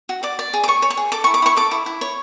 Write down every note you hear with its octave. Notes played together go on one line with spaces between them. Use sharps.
F#4
D5 D6
D5
G#4
D6
C#5 C#6
C#5
C#6
G#4
A4 D6
C#6
E4
D6
E4 C#6
A4 D6
E4
E4
C#5